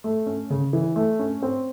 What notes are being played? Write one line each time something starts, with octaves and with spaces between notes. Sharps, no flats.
A3
C#4
C#3
E3
A3
C#4
C4